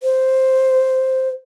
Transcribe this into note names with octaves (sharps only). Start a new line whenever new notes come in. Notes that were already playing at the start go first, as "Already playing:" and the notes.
C5